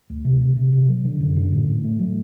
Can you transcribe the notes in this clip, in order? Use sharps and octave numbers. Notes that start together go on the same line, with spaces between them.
D2
C3
C3
C3
C3
F#3
D3
F#2
D3
A2
A2
A3
F#3